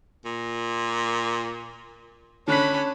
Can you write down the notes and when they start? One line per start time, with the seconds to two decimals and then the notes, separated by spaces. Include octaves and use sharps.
0.25 A#2
2.48 D3 C#4 D4 B5 F#6 B6